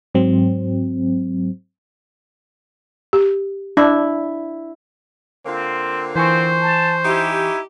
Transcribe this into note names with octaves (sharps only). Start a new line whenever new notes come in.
G#2 F#3 C4
G4
D4 E4
D3 A#3 C4 F4
E3 C4 C5 G#5 C#6
A5
D#4 E4 G4